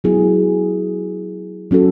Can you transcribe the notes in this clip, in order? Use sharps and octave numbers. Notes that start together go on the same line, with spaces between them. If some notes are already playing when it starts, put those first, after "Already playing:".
F#3 B3 E4 G#4
F#3 C#4 F#4 A4